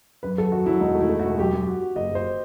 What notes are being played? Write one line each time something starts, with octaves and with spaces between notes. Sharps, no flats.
F#2 B4
F#3 A4
F#2 F#4
F#3 E4
E1 D#4
A3
E4
A3
F#4
E1
F#2 G4
F#2
F#4
F#4
F#1 D#5
F#1 C5